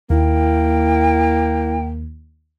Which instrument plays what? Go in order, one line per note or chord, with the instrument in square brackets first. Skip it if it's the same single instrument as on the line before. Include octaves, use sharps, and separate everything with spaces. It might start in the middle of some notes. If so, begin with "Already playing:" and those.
[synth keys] D#2 [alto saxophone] A#3 [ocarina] E4 [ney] G5